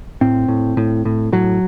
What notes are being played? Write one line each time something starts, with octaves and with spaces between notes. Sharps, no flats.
A2 C4
A2
A2
A2
A2 F#3